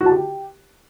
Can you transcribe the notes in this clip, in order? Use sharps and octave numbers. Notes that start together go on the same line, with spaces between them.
F#4
A5
G4